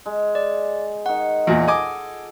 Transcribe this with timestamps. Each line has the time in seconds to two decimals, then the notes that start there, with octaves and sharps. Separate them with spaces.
0.06 G#3
0.35 D5
1.06 D#3 F#5 C#6
1.47 E2 A#2
1.67 F4 A4 D#5 G#5 D6